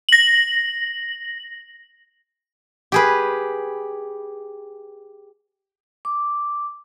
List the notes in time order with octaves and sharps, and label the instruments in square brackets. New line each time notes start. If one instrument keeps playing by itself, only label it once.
[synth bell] A#6 F#7
[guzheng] G4 G#4 B4
[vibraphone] D6